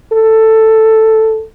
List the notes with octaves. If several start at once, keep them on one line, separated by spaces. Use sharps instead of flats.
A4